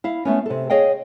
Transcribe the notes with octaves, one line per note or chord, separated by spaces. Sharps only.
E4 F5
A3 B3 C#4
C3 A4
G#4 C#5 D#5 F5 G5